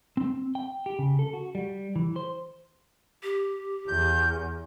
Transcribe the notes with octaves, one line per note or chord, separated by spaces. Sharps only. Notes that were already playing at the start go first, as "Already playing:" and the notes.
C4
G5
G4
C#3
A4
F#4
G3
E3
C5
G4
E2 G6